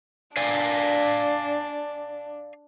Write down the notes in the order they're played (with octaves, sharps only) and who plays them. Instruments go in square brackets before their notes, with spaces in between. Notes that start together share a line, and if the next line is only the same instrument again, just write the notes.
[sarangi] D4 [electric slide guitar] D5 F5 G#5